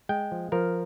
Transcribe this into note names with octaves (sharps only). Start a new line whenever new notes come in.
G#3 G5
F3
F3 A#4